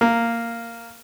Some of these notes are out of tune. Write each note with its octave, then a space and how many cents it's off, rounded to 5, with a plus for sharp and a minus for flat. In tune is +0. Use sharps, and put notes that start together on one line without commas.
A#3 -10